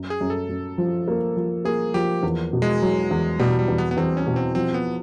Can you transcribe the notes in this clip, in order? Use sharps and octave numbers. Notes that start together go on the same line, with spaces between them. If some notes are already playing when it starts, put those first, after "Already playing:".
Already playing: F#2
G#4
F#2
A4
F#2
F3
A#3
F3
A#3 G#4
F3 G4
E2
B2
G#3
F#3
E2
B2 G3
G3
E2
B3
B3
E2 C4
C#4
B2
C4
F3 C4
B3